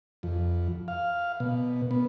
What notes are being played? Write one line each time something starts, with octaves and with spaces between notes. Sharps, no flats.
F2
F5
B2
B3